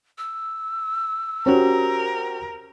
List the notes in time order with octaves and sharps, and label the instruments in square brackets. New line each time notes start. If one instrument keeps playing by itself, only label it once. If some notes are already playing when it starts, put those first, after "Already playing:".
[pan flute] E6
[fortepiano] C#4 [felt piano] F#4 G4 C5 [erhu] A#4